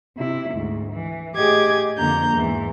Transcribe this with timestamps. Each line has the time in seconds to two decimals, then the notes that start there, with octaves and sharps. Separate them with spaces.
0.16 C3 E4
0.53 D2 G#2
0.93 E3
1.36 A2 G4 G#4 D#5 D6 G#6
1.97 F2 D3 F3 A#3 A#5 G6
2.35 E2 G#2 E3